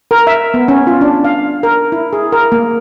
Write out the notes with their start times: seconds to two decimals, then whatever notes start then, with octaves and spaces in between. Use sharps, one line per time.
0.11 A#4
0.27 E5
0.54 B3
0.68 C#4
0.87 F4
1.01 D4
1.24 F5
1.63 A#4
1.92 E4
2.13 G#4
2.32 A#4
2.52 A#3